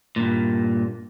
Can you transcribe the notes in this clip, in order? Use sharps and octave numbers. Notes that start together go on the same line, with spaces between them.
G2 A#2